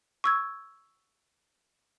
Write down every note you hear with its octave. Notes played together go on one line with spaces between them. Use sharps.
C#6 E6 G#6